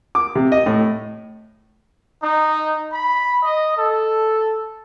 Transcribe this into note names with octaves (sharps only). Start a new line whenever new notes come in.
D6
C3
D#5
A2
D#4
B5
D#5
A4